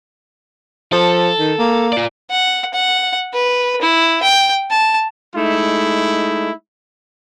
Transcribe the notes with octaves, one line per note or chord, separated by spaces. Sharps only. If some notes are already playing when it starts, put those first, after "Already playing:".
F3 A4
D#3
A#3
F4 D5
F#5
F#5
B4
E4
G5
A5
G#3 A3 D#4 E4